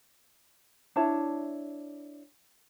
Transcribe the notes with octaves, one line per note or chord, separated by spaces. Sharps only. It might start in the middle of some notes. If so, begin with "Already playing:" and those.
D4 E4 C#5 A5